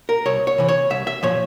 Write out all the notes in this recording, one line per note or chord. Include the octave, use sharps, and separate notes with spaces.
A#4
C2 C#5
C#5
C3 E3
C#5
C2 E5
E5
A#2 F3 C#5